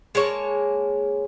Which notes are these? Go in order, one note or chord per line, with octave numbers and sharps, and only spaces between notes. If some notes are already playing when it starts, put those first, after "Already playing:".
G#3 A#3 C#5 A5